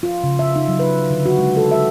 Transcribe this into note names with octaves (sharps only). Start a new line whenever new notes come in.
F4
C#3
E5
D#4
F#3
B4
D3
F#4
G#3
A4
E5